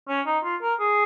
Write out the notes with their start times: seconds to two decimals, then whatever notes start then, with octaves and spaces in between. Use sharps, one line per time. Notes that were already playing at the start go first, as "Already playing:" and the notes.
0.08 C#4
0.26 D#4
0.44 F4
0.62 A#4
0.80 G#4